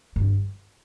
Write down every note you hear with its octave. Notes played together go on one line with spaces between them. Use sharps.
G2